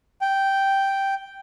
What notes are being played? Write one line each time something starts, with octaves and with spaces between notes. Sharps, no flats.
G5